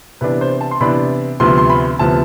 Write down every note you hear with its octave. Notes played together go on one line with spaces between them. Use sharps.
C3 E3 B3 D4 B4
C5
A5
C6
C3 E3 B3 D4 B5
D2 C3 F3 B3 C6
C6
B5
D2 C3 F3 B3 A5